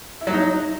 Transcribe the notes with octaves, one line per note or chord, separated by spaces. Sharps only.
E4
F#3
D#4